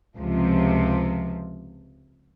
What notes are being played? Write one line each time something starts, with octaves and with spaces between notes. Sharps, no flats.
C#2 C3 F3